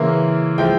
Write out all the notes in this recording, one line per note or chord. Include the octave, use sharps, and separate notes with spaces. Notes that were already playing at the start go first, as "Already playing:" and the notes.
Already playing: C#3 E3 A#3 E4 C6
F3 G#3 E4 G5